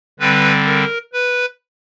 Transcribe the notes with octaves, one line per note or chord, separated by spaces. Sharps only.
D3 G3 C4 B4
A#4
B4